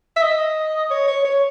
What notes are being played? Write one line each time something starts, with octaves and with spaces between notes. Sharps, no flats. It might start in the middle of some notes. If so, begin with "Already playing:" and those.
E5
D#5
C#5
C#5
C#5